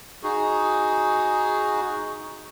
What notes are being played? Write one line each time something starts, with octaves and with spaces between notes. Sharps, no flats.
D#4 F#4 G#4